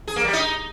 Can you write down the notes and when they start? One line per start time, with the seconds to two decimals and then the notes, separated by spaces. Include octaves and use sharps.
0.08 G#4
0.16 A#3
0.25 G3
0.33 D#4